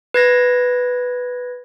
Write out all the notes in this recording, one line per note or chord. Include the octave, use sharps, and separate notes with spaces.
B4 G#6 A#6